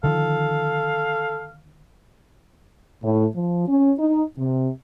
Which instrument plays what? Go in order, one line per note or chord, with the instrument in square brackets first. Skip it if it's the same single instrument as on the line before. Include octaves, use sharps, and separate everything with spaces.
[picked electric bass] D3 D#3 F3 [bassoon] A4 [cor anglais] F5
[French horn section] A2
F3
C#4
D#4
C3